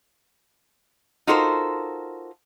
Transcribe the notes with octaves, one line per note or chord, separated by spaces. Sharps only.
D#4 F4 F#4 A4 A#4 C5